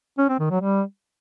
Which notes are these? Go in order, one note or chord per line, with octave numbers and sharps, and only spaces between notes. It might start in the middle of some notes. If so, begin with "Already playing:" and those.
C#4
C4
D#3
F#3
G3